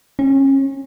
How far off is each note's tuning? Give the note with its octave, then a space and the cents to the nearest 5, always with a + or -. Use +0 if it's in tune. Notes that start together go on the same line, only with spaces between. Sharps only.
C#4 -30